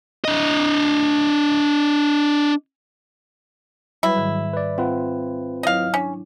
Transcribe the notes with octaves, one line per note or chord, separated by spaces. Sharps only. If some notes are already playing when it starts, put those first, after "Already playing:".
D4 D#5
F#3 G3 E4 B4
G#2 D#3
B4 D5
C4 F4 B4 F#5
F#3 E4 C#5 D#5 F5
C#4 D4